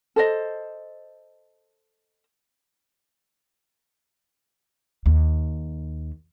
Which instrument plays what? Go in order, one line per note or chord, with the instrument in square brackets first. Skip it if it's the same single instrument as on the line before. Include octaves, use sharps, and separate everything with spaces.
[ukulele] A4 C5 D#5
[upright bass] D#2